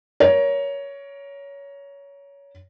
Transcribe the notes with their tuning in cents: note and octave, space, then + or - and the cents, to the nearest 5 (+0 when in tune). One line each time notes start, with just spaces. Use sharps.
A#4 +15 C#5 +15